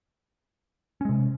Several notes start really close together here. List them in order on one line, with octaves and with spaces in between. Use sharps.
C#4 G#3 C3